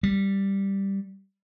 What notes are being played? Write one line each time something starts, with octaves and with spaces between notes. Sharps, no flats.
G3